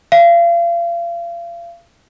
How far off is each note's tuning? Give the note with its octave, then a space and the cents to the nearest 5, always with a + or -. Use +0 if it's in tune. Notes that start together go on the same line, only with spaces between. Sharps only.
F5 -35